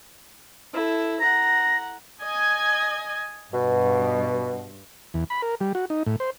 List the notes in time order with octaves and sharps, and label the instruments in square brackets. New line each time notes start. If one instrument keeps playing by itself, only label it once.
[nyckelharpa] E4 A4
[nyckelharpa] F#5 A#5 [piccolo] A#6
[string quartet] D#5 G#5 G#6
[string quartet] G2 [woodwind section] B2
[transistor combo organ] E2
B5
A#4
G3
F#4
D#4
A2
C5